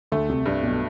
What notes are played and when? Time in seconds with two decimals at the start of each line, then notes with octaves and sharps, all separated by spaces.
0.12 D2 D3 A3
0.29 C2 C3
0.46 C2 G2 C3
0.63 B1 B2